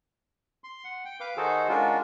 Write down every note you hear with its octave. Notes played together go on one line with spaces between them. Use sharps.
C6
F#5
G5
B4 F5 D6
D#3 D#4 F#4 G#4 A4 C5
G#3 C#4 D4 F4 F#4 A#4